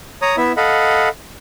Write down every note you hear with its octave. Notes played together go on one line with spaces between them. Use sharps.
C#5 A#5 D#6
B3 E4 E5
A4 D#5 F5 F#5 B5